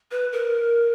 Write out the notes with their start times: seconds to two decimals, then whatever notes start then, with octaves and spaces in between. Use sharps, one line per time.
0.11 B4
0.33 A#4